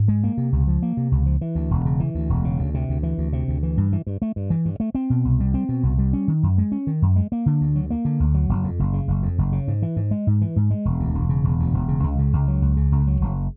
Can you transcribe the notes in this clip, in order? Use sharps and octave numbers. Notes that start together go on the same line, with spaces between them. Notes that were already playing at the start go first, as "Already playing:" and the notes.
Already playing: G#2
G#3
A#3
C3
C#2
F3
A#3
C3
C#2
F3
E3
D2
E1
C#3
E3
D2
E1
C#3
D2
C3
D2
E3
D2
C3
D2
E3
G2
E3
G2
A3
G2
E3
G2
A3
C4
B2
C2
G3
C4
B2
C2
G3
C#4
D#3
F#2
G#3
C#4
D#3
F#2
G#3
A#3
D3
D2
F#3
A#3
D3
D2
F#3
F#1
F2
F#1
C#3
F#1
F2
F#1
C#3
G#2
E3
G#2
G#3
G#2
E3
G#2
G#3
E1
D2
E1
C#3
E1
D2
E1
C#3
C#2
C#3
C#2
F#3
C#2
C#3
C#2
F#3
F#1